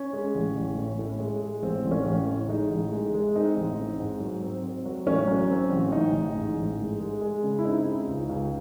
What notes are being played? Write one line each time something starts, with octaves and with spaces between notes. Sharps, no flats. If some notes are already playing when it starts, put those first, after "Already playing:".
Already playing: C#4
G#3
A1
A1
A2
A2
G#3
G#3
A1 C4
A1
C#4
A1
A2
G#3 D#4
A1
G#3
G#3
C4 D#4
A1
C4
G#2
F#3
C4
C4
F#3
A1 C#4
F#3
C4
A1
A1 D#4
A1
G#2
A1
G#3
G#3
G#3
C#3
E4
C4 D#4
G#3
C#2
C#2